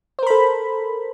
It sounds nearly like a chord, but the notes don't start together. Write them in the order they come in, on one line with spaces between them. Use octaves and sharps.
C5 A#4 B5 A4